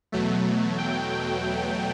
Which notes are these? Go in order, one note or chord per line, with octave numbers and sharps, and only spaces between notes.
E2 B2 F#3 A3
G5